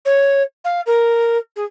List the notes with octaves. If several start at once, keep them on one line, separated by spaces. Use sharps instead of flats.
C#5
F5
A#4
G#4